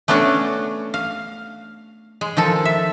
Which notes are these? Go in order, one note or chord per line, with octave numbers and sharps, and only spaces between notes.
A3 B3 C#4 D4 F#4
F5
G#3
D#3 F3 A4
E5